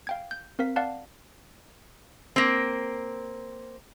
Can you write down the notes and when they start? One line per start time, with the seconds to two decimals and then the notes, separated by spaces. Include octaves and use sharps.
0.07 F5 G5 G#6
0.31 G6
0.59 C4 A#4 F5 B6
0.76 D5 F5 F#5 A5 F#6
2.36 A#3 C4